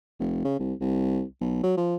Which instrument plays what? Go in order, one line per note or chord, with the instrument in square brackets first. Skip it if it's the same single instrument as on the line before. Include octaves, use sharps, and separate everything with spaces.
[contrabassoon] F1
C#3
C2
C2
B1
F#3
F3